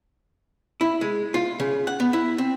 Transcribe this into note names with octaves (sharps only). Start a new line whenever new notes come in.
E4
G#3
F4
C#3
F#5
B3
E4
C4